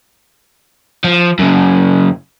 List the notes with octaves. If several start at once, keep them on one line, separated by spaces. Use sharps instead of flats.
F3
F#2 C#3